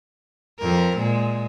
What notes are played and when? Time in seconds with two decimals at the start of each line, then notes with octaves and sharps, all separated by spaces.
0.59 F2 A#4
0.97 A#2 G#3